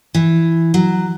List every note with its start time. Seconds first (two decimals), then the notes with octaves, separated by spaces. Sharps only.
0.14 E3
0.74 F#3